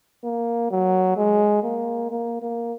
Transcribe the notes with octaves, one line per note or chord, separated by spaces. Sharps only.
A#3
F#3
G#3
A#3
A#3
A#3